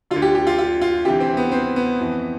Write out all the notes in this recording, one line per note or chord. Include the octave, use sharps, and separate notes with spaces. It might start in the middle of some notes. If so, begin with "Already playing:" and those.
D3 F4
D2
G4
G4
F4
F4
F4
D2 C3 E3 G4
C4
B3
C4
B3
F2 E3